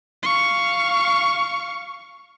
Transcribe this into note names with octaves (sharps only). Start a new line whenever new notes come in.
F5 C#6